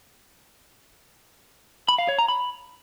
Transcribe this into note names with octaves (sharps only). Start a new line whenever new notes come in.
B5
F5
C#5
A#5
B5